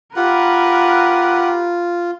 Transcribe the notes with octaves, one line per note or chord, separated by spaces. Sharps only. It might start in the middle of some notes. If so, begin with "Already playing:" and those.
F4 G4 A#4 B4 F#5